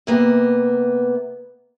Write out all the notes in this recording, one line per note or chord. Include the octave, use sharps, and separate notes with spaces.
C3 A#3 B3